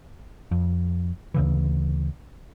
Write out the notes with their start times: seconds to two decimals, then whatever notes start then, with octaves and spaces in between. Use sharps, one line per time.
0.51 F2
1.34 D2 C#3 E3